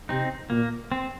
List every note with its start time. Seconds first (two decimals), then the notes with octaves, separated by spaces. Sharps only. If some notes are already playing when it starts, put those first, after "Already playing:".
0.09 C3 C4 D#4
0.50 A#2 A#3
0.92 C4